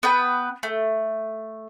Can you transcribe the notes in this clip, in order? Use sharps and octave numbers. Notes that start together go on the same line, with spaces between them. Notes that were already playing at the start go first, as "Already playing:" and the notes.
B3 B4 G5
A3